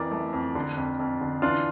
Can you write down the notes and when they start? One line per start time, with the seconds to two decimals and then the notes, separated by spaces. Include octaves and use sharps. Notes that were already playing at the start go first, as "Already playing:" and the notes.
Already playing: F2 E3 A#4 D5
0.11 A3
0.33 F2
0.55 D3
0.77 F2
0.99 F2
1.21 D3
1.42 E3 D4 F4